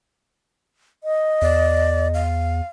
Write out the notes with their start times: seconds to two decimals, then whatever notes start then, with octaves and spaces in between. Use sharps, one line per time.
1.04 D#5
1.42 E2 D5
2.14 F5